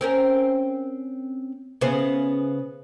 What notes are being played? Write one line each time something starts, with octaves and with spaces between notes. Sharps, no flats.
C4 C#4 A#4
C#3 B3 C5